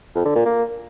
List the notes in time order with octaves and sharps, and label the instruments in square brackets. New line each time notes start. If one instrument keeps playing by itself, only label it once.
[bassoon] F2
D3
A#2
A#3